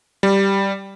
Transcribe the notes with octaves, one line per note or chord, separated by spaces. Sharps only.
G3